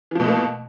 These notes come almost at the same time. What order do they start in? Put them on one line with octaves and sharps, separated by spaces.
E3 F3 B2 A3 A#3